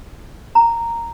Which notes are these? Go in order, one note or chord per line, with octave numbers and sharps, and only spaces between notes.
A#5